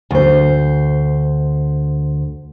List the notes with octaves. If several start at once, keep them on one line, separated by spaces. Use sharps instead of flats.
D2 C5